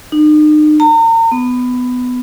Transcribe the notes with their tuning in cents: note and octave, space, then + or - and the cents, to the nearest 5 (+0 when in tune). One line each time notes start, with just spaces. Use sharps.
D#4 -40
A#5 -40
B3 +15